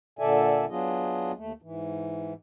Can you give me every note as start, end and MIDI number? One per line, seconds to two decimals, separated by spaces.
0.19 0.65 46
0.19 0.65 50
0.19 0.65 69
0.19 0.65 74
0.19 0.65 76
0.19 0.65 80
0.69 1.32 54
0.69 1.32 59
0.69 1.32 62
0.69 1.32 65
0.69 1.32 68
0.69 1.32 75
1.36 1.52 39
1.36 1.52 57
1.62 2.33 44
1.62 2.33 52